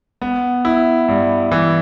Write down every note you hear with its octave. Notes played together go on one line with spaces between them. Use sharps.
B3
E4
G2
E3